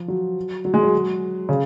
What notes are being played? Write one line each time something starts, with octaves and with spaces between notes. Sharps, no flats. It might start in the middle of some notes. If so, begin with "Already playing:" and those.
Already playing: F3
F#3
F#3
G#3
F#3
C#3